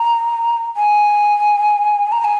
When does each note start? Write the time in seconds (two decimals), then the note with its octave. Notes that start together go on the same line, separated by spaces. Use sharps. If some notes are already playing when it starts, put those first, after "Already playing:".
Already playing: A#5
0.77 G#5
2.12 A#5
2.24 G#5